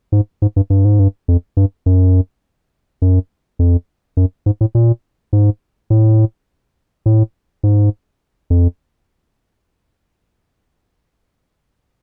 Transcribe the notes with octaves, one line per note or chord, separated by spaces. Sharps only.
G#2
G#2
G2
G2
G#2
G2
F2
G2
F#2
F#2
F2
F#2
G#2
A2
A#2
G#2
A2
A2
G#2
F2